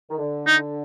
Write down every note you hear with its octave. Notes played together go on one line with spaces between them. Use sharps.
D#3
D3
D#4